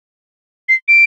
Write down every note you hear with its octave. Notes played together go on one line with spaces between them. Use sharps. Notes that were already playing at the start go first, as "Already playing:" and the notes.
C7
D7